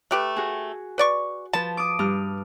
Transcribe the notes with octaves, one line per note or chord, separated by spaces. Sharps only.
A3 G4 B4 F#6
F#4 G#4
B4 D5 C#6
F3 B4 A5
D6 D#6
G2 F6